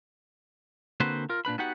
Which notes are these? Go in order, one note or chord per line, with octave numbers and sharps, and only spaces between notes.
D3 A#3 C4 F#4 B4 C5
F4 A#4
A#2 D4 B4 B5
B3 D#4 F#4 G4 F#5